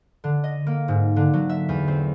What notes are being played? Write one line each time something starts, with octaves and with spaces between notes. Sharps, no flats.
D3
D#5
A#3
G#2
D3
F#3
E5
E2
C4